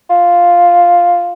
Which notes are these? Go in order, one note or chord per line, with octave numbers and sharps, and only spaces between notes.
F4